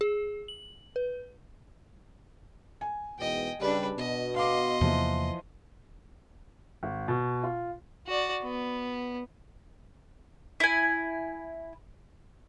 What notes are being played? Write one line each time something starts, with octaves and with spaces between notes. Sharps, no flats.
G#4
F#7
B4
G#5
E2 G#2 B2 D#5 G5
C#3 G3 D4 B4
B2 D#5
D#5 F5 C6 D6
E2 C3 E3 F3 A#3
G#1
B2
F4
F#4 D5
B3
E4 G#5